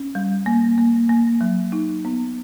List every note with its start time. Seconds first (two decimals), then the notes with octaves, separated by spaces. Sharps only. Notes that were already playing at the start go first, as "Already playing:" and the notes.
Already playing: C#4
0.15 G3
0.46 A#3
0.78 A#3
1.09 A#3
1.41 F#3
1.72 D#4
2.05 B3